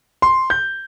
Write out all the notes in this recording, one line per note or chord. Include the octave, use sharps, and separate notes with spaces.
C6
G6